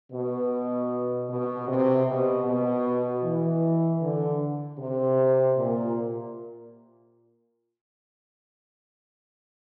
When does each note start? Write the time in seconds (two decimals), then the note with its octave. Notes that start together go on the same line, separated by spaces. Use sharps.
0.12 B2
1.29 B2
1.67 C3
2.07 B2
2.45 B2
3.23 E3
4.01 D3
4.78 C3
5.56 A#2